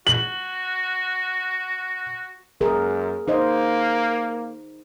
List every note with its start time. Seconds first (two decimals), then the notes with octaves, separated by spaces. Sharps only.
0.07 F#4 F#7
2.61 F#2 G#4 A#4
3.28 A#3 D#4 C5 D#5